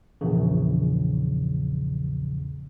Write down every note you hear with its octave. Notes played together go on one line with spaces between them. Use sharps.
A#1 E2 C#3